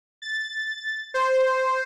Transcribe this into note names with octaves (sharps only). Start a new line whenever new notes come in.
A6
C5